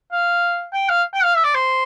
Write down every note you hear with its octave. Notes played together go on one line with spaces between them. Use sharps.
F5
G5
F5
G5
F5
E5
D5
C5